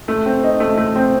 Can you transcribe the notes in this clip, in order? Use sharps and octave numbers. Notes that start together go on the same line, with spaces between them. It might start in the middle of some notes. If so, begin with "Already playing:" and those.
A3
C4
D#4
A3
A3
C4